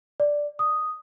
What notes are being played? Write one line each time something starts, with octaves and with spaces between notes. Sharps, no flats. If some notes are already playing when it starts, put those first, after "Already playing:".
D5
D#6